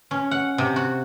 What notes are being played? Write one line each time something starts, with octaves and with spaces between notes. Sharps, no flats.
C#4
F#5
C3
F#4